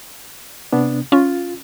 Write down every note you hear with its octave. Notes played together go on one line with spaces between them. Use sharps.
C3 B3 D4
C#4 F4